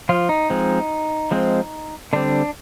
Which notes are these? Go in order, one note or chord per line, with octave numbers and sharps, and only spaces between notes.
F3 F4
D#4
F3 G#3 C4
F3 G#3 C4
D3 G3 C4 D4